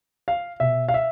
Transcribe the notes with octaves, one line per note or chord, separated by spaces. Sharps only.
F5
B2 E5
F5
E5